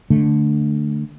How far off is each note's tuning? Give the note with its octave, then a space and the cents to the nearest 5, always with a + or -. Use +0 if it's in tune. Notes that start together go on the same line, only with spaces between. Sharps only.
D3 +0 A3 +0